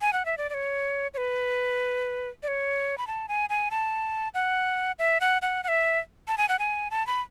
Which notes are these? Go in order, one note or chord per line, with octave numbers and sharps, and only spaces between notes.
G#5
F#5
E5
D5
D5
C#5
C#5
B4
D5
C#5
B5
A5
G#5
G#5
A5
F#5
E5
F#5
F#5
F#5
E5
A5
G#5
F#5
G#5
A5
B5